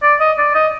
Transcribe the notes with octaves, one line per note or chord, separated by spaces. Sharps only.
D5
D#5
D5
D#5